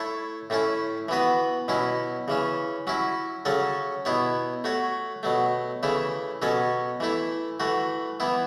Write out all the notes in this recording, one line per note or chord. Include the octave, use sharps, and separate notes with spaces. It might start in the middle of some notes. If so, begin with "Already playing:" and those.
Already playing: A3 E4 A4 C#5
A2 A3 C#4 E4
E3 B3 F#4 B4
B2 F#3 C#4 E4
C#3 E3 C#4
F#3 C#4 E4
C#3 F#3 C#4 A4 C#5
B2 B3 E4 C#5
A3 F#4 C#5
B2 F#3 A3
C#3 E3 A3 E4
B2 F#3 C#4 A4 C#5
E3 A3 E4
E3 A3 F#4
E3 B3 E4